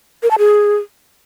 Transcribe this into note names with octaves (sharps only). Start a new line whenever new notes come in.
A#4
A5
G#4